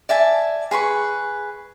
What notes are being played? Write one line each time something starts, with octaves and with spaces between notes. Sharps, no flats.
D5 E5 G#5 A5
G#4 B4 C6 C#6